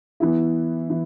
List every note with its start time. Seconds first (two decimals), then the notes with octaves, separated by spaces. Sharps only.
0.20 E3 B3 E4
0.90 E3